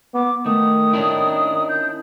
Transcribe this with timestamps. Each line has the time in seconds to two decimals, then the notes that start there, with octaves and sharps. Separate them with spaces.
0.14 B3 D6
0.46 D#3 A3 D#6
0.93 C#4 D4 E4
1.69 G6